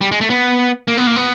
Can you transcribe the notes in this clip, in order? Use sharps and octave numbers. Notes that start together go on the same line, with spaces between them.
G3
G#3
A3
B3
A#3
B3
A#3
B3